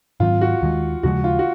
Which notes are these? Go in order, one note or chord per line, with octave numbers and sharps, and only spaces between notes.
G#2 D#3 F#3 C4 F4
F#4
D#2 D#3 G#3
D#2 C#3 F3 G#3 F#4
F4
F#4